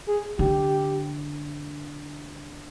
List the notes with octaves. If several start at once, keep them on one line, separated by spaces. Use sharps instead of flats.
G#4
D3 G4